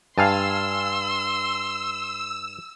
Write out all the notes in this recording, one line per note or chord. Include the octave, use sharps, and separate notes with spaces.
G2 F5 G#5 A5 C6 E6